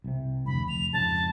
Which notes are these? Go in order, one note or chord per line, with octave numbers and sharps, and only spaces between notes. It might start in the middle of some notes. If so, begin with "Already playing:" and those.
C2 C3
F1 D2 B5
F1 F7
F2 G#2 C#3 A5